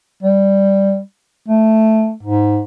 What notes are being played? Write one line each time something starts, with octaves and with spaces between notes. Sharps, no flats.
G3
A3
G#2